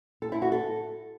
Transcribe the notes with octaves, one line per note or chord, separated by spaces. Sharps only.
A4
E4
F#4
A4